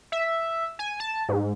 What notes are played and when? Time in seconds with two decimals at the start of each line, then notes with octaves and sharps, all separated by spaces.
0.12 E5
0.79 G#5
1.00 A5
1.29 G#2